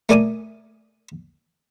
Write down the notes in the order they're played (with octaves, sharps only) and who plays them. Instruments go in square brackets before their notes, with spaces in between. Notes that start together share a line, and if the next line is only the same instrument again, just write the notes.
[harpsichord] A3 A#4 D5 G#5 D6 D#6